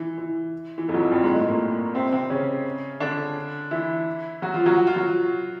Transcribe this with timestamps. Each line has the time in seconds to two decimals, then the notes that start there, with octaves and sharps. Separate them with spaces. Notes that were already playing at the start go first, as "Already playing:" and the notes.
Already playing: E3
0.18 E3
0.78 E3
0.88 F2 F3
0.94 F#3
1.00 F2 F3
1.11 G2 G3
1.23 G#2 G#3
1.35 A2 A3
1.47 A#2 A#3
1.94 C3 C4
2.12 C3 C4
2.30 C#3 C#4
3.00 D3 D4
3.71 E3 E4
4.42 F#3 F#4
4.54 F3 F4
4.66 F#3 F#4
4.77 F#4
4.87 F4
4.96 F#3 F#4